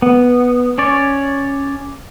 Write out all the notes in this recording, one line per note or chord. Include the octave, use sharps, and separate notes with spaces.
B3
C#4 C#5 D5